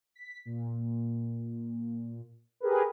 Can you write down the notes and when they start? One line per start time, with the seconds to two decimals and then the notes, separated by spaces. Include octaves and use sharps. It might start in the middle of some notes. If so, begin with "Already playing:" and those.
0.15 B6
0.45 A#2
2.60 G4 G#4 A#4 B4